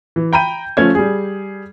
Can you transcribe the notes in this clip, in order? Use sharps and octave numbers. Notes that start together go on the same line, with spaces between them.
E3
G5 A#5 B5 G6 D#7
F3 A3 C#4 G#6
G3 G#4